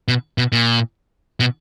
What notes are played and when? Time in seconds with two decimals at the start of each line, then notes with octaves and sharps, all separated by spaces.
0.08 B2
0.38 B2
0.52 A#2
1.40 B2